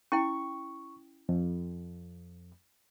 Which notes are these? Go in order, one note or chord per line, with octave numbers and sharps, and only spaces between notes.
C#4 E4 G5 C#6
F2